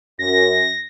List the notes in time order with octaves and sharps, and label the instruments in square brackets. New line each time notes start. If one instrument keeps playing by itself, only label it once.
[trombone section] F#2 [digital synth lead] A#6